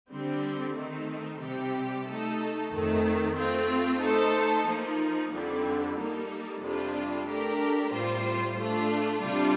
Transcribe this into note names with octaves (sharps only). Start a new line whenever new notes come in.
D3 G3 C4
D#3 A3 C4 D#4
C3 G3 C4 G4
A3 D#4 A4
F2 D#3 A3
A3 C4 F4
A3 D#4 A4 C5
F3 A#3 D#4
F2 D3 G3
G3 A#3 D#4 A4
F2 C3 G3 D4 F4
A3 D4 G4 A#4
A2 G3 C4 F4 C5
A3 D4 F4
C3 G3 D4 F4